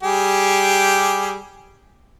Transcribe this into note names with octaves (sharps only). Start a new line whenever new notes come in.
G3 G4 G#4